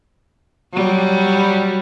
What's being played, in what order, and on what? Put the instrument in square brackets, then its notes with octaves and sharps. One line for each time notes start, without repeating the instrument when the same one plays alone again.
[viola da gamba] F#3 G3